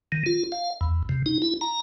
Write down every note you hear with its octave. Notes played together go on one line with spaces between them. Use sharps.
D#3
F4
F5
E2
C3
D#4
E4
A#5